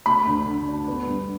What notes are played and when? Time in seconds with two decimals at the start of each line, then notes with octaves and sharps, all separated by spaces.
0.06 A3 B5
0.27 D2
0.47 D3
0.67 D4
0.88 B3
1.07 G2